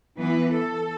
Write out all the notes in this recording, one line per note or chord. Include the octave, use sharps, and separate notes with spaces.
E3 B3 B4
A4